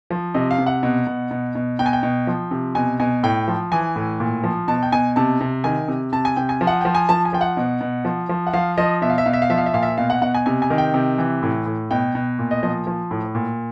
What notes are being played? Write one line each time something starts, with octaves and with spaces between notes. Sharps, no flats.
F3
C3 D#5
F5
C3
F#5
B2
B2
B2
B2
B2 G5
G#5
G5
B2
F3
C3
B2 G#5
B2 G#5
A2 G5
F3
E3 G#5
A2
A#2
F3
B2 A5
G5
B2 G#5
C3 A5
C3
D#3 G#5
C3
C3 A5
G#5
C3 G5
G#5
F3
F#5
F3 G5
G#5
F3 A5
G#5
F3 G5
F#5
B2
B2
F3
F3
F#5
F3 F5
F3 D#5
B2 E5
F5
E5
B2 F5
E5
F5
F3 E5
F5
E5
A#2 F5
E5
B2 F5
F#5
B2 F#5
G#5
C3 G#5
G#5
D#3
G5
C3
E3
A2
A2
B2 G5
B2
A#2
D#5
F3 D#5
F3
A2
A#2